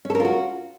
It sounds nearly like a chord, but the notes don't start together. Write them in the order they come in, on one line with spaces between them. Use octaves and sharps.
C#4 A4 A#4 F4 F#4